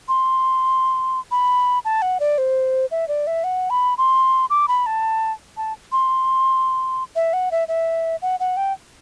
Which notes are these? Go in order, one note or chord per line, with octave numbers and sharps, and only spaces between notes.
C6
B5
A5
F#5
D5
C5
E5
D5
E5
F#5
B5
C6
D6
B5
A5
A5
C6
E5
F#5
E5
E5
F#5
F#5
G5